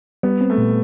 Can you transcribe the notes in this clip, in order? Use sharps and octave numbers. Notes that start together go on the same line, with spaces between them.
G3 B3
C4
A3
A#2